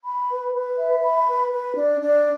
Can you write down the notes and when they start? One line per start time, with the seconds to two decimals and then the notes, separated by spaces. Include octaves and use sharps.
0.05 B5
0.29 B4
0.54 B4
0.78 E5
1.03 B5
1.27 B4
1.51 B4
1.76 D4
2.01 D4